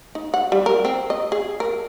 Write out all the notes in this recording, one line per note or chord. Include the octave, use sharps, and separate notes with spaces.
D#4
F#5
G3
A#4
C4
D#5
G#4
A#4